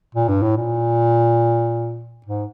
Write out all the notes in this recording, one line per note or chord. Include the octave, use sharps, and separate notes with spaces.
A#2
G2
A2
A#2
G#2